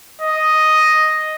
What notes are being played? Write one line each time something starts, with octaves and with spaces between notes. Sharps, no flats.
D#5